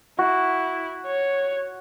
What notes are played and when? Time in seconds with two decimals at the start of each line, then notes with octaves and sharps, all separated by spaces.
0.19 E4 F#4
1.06 C#5